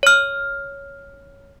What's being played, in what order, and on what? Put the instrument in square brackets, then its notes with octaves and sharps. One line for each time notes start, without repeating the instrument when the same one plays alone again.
[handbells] C#5 F6